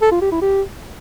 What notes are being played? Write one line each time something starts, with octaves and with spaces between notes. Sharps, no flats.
A4
F4
G4
E4
G4